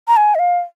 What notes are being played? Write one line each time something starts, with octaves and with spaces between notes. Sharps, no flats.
A#5
G#5
D#5
F5